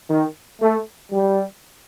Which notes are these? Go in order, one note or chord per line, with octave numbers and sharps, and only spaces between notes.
D#3
A3
G3